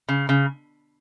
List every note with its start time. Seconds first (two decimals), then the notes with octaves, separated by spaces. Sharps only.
0.09 C#3
0.29 C#3